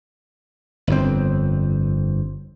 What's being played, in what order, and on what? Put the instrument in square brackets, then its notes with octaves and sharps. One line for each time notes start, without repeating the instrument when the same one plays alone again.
[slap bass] G1 F2 C4